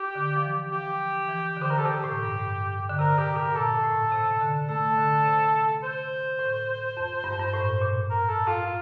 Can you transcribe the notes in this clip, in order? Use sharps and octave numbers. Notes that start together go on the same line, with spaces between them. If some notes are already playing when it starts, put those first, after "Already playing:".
Already playing: G4
D3
F3
E3
F3 G4
E3
D3
C5
A#4
A4
C3 G4
A2
G2
D3
C3 A#4
G4
A#4
A#2 A4
A2
C3
D3
A3 A4
D3
C3
C5
A2
F2
G2
F2
G2
A2
A#2
A#4
A4
F4
F4